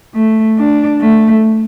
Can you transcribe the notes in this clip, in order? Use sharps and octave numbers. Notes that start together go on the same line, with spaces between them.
A3
D4
A3